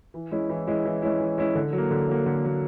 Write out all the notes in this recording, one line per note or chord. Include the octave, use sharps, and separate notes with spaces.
E3
G#3 C#4 E4
E3
G#3 C#4 E4
E3
G#3 C#4 E4
E3
G#3 C#4 E4
D3
F#3 A#3
D3
F#3 A#3
D3
F#3 A#3